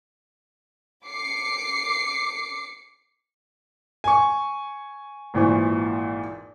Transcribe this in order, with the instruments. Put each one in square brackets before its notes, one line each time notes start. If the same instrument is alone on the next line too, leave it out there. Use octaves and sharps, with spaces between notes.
[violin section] D6 C7 C#7
[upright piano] G#5 C#6
G#1 A#2 E3 C5 C#6